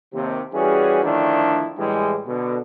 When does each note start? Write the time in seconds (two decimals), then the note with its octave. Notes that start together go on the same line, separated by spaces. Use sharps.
0.14 D#2 C3
0.54 E3 G3 C#4 F#4 G#4
1.03 D3 D#3 F3 A3 D4 E4
1.78 A2 E3 G3 G#3
2.26 B2 D3